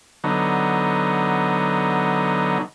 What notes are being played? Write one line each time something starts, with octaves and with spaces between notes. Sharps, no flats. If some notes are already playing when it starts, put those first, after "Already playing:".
D3 F#3 B3 D#4